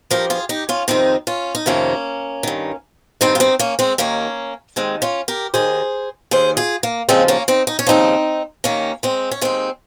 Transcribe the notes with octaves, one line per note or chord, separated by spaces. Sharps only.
G2 F3 G4 A#4
F4 G#4
D#4 G4
C#4 F4
F2 C3 D#3 C4 D#4
C#4 F4
D#4
F2 C3 D#3 A#3 C#4
G2 D#3
G2 D#3 C4 D#4
F4
C4 D#4
A#3 C#4
G#3 C4
D#2 D#3 A#3 C#4
D#2 D#3 G#3 C4
C#4 F4
G4 A#4
D#2 D#3 G#4 C5
D#2 D#3 G#4 C5
F4 G#4
A#3
D#2 C#3 F3 G#3 C4
A#3 C#4
C4 D#4
D#4
C#4
D#2 C#3 F3 C4 D#4
D#2 D#3 A#3 C#4
G#3 C4
C#4
D#2 D#3 G#3 C4